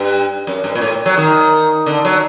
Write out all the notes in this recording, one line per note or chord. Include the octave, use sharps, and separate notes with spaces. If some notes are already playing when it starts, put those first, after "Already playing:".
Already playing: G2
F#2
G2
A#2
A2
F#3
D#3
D3
F#3